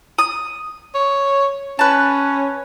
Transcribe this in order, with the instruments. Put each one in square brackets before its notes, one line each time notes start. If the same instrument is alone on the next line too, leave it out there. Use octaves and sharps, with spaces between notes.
[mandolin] D#6
[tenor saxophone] C#5
[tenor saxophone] C#4 [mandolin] B4 A5